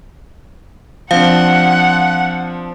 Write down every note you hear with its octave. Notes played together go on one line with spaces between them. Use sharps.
F3 C4 D4 F5 F#5